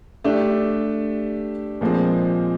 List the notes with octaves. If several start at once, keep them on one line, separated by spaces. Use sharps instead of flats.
A3 D4 G4
A#2 F3 G#3 C4